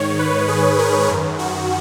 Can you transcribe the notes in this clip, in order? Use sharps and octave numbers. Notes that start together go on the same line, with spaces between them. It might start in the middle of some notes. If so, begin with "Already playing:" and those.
Already playing: G#2 D#3 C#5
B4
G#4
A#4
F#2 D#3
F#4